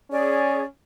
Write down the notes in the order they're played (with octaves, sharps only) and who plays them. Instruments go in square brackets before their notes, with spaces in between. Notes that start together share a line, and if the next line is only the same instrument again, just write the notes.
[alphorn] C#4 [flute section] G#4 D5